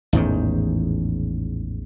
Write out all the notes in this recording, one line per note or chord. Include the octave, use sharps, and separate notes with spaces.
A1 E2 G#2 D#3